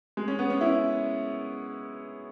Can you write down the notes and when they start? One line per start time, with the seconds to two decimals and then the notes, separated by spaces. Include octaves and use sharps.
0.17 G#3
0.28 C#4
0.39 B3
0.50 C#4
0.61 E4